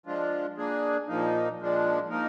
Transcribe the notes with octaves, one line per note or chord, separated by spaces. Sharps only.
F3 G#3 D4 F4
A#3 D4 G#4
A#2 F3 A#3 D#4
A#2 F3 G#3 D4
F3 A#3 D#4 A#4